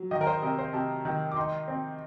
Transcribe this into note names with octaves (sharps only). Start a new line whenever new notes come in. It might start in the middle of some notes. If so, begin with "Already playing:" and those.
Already playing: F#3
D#3 D#5
A#4
C5
C3 A#4
C5
C3 A5
D#3
D6
D#4 C6
C4